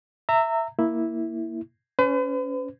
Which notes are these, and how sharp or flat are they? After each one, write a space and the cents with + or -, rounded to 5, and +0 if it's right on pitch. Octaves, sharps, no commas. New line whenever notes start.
E5 +0 A#5 -25
A#3 +0 E4 -5
C#4 +15 B4 +45